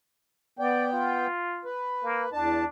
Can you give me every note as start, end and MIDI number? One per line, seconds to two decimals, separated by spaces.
0.59 1.27 59
0.59 0.93 74
0.59 1.27 79
0.93 1.70 65
1.65 2.30 71
2.04 2.27 58
2.32 2.64 40
2.32 2.69 62
2.32 2.64 81